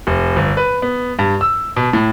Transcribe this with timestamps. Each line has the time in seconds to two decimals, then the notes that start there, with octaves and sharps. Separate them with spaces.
0.07 F1
0.36 G1
0.57 B4
0.82 B3
1.19 G2
1.41 E6
1.76 B2
1.93 A2